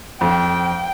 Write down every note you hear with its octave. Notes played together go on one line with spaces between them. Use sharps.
F2 G5